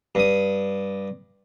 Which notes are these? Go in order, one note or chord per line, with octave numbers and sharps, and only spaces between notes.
G2 D#6